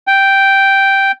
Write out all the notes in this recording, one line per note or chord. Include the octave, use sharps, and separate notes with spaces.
G5